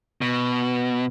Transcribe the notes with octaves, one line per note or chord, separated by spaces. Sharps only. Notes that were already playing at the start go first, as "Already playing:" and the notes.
B2